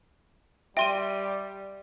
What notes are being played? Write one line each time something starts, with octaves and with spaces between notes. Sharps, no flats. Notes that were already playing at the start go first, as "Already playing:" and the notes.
G3 E5 G5 C6 D#7